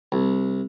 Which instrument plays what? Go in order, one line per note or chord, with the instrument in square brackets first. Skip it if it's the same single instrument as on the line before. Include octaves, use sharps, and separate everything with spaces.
[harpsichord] C2